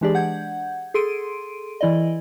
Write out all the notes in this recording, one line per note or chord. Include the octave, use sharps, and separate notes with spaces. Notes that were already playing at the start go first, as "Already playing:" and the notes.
E3 G#3 D4 G4 G#4 D5
F#5 G6 G#6
G#4 A4 C6 D7 D#7
E3 E4 D5 D#5